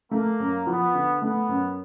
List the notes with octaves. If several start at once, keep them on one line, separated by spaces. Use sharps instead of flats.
A3 A#3
F#2
F3 B3
D3
A3 B3
F#2